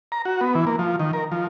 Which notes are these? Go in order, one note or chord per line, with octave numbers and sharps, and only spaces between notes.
A#5
F#4
B3
E3
A#3
F3
D#3
A#4
F3